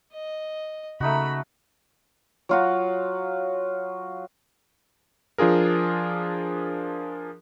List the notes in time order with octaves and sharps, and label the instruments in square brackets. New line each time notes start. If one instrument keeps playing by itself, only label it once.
[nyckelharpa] D#5
[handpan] C#3 [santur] A3 D#4 F#4 [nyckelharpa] B5
[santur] F#3 F4 F#4
[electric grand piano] F3 D4 F4 G#4 A#4